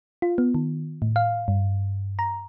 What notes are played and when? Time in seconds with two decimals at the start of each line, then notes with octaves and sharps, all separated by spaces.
0.22 F4
0.38 B3
0.55 D#3
1.02 A2
1.16 F5
1.48 G2
2.19 A#5